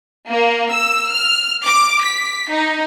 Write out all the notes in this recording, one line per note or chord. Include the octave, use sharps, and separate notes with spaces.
A#3
E6
F6
D6
B6
D#4